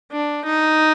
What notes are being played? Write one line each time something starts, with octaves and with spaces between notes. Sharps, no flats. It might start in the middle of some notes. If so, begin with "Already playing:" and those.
D4
D#4